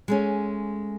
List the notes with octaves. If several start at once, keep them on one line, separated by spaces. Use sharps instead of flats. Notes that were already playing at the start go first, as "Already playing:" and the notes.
G#3 A3 C#4